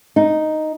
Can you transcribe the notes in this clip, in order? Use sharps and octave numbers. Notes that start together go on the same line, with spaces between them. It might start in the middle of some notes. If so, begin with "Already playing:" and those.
D#4